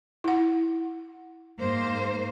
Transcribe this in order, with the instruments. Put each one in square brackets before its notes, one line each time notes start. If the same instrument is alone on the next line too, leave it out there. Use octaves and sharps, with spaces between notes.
[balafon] E4 F#5
[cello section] G#2 A#3 C5